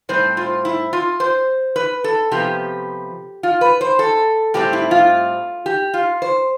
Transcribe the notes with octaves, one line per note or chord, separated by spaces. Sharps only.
A2 G3 C4 C5
F4
E4
F4
C5
B4
A4
C3 F3 B3 G4
F4
B4
C5
A4
A2 G3 C4 G4
E4
F4
G4
F4
C5